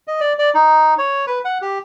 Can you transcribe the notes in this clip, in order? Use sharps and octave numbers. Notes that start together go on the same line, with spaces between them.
D#5
D5
D5
D#4
C#5
B4
F#5
G4